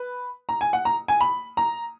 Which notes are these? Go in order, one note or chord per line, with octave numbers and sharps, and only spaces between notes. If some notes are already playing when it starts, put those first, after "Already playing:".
Already playing: B4
A#5
G#5
F#5
A#5
G#5
B5
A#5